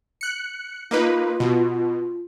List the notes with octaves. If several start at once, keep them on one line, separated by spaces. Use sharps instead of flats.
F#6 C#7
A#3 D#4 F4 B4
B2